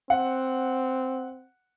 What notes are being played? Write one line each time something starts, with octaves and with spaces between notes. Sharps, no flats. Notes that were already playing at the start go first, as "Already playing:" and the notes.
C4 F#5